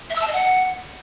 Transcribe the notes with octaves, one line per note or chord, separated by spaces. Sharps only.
E5
E6
A5
D#5
F#5